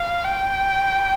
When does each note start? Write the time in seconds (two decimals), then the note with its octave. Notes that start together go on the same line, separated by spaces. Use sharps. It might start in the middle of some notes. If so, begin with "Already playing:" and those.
Already playing: F5
0.24 G5